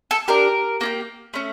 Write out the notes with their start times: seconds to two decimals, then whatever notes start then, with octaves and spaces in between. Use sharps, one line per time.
0.11 A4
0.28 D4 G4 A#4
0.81 A#3 E4 G4
1.34 A3 C#4